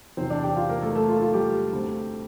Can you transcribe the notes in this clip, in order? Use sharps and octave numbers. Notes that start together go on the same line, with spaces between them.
E2 C3 E3 C4 C5
D4 D5
G4 G5
F4 F5
A#3 A#4
A3 A4
A3 A4
F4
F4
G3 G4
D2 D3 A3 C4